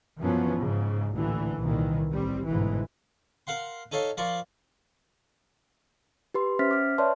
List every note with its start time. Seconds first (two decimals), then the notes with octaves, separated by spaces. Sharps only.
0.20 F#2 E3 F3 B3 C#4
0.59 G#2 C#3
1.14 A1 D2 A#2 D3 E3
1.61 C2 A#2 D#3 E3
2.13 A1 G3 C4
2.47 G1 G#2 B2 E3
3.47 A#4 F5 F#5 C6
3.92 D#4 A4 C#5 E5 F5
4.17 F3 A#4 D5 C6 C#6
6.34 G4 B4 C6
6.59 C#4 C5 E5 F6 A6 B6
6.71 D6 F6
6.98 B4 C#5 D5 E5 A5 C6